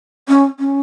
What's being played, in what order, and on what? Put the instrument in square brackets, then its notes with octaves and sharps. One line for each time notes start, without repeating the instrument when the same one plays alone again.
[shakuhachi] C#4
C#4